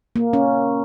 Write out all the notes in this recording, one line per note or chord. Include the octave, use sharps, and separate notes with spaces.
A#3
C#4